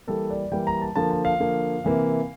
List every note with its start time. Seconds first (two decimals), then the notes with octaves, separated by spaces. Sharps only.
0.07 E3 G3 A#3 A4
0.30 D5
0.52 E3 G3 A#3 G5
0.67 A#5
0.82 A5
0.96 D3 F3 A#3 A5
1.11 A5
1.25 F5
1.40 D3 F3 A#3
1.84 C3 E3 A#3